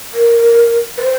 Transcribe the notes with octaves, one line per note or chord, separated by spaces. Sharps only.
A#4
B4
C5